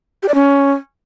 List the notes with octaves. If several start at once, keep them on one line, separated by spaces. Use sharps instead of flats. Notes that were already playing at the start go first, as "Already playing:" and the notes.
G4
D5
C#4